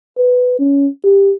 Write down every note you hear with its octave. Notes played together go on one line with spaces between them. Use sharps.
B4
C#4
G4